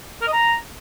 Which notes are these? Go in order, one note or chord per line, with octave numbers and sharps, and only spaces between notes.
A#4
D#5
A#5